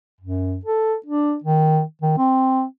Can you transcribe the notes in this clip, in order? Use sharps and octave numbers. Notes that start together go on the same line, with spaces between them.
F#2
A4
D4
D#3
D#3
C4